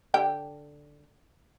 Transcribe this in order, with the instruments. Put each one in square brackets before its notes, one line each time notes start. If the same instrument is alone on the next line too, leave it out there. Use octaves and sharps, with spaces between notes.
[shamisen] D3 G4 G5